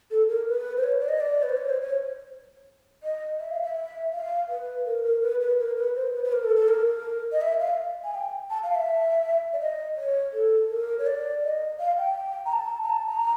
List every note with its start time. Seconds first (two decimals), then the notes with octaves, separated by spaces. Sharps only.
0.11 A4
0.29 A#4
0.48 B4
0.77 C5
0.83 C#5
1.01 D5
1.09 D#5
1.20 D5
1.43 B4
1.50 C5
1.57 C#5
1.69 C5
1.81 C#5
3.03 D#5
3.40 E5
3.51 F5
3.62 E5
4.13 F5
4.49 B4
4.86 A#4
5.04 A#4
5.22 B4
5.40 B4
5.59 A#4
5.76 B4
5.95 C5
6.14 B4
6.24 B4
6.32 A#4
6.44 A4
6.56 A4
6.68 A#4
7.32 D#5
7.41 E5
7.60 F5
8.04 G#5
8.14 G5
8.50 A5
8.63 F5
8.75 E5
9.53 D5
9.60 D#5
9.97 C#5
10.33 A4
10.69 A#4
10.99 C#5
11.06 D5
11.43 D#5
11.79 F5
11.97 G5
12.46 A#5
12.53 A5
12.83 A#5
12.90 A5
13.07 A#5